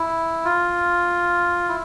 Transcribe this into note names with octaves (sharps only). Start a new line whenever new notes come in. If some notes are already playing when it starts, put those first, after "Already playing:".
Already playing: E4
F4
E4